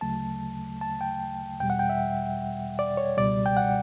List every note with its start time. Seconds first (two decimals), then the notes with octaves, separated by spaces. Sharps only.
0.01 D2 C#3 F#3 A3 A5
0.81 A5
1.01 G5
1.60 E2 B2 G3 G5
1.70 F#5
1.79 G5
1.89 E5
2.79 D5
2.97 C#5
3.17 C#2 B2 G3 D5
3.46 G5
3.57 F#5